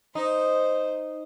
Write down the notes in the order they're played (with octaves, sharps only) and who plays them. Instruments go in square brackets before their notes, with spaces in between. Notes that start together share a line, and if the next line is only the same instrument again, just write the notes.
[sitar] D#4 [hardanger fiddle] C5